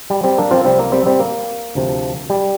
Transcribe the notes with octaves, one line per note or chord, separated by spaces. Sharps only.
G3
G3 C4
A#3 D4
C4 F4
C2 C3 F3 G3 C4
A#3
G3 C4
G3 C4
A#3
D2 C3 F3
G3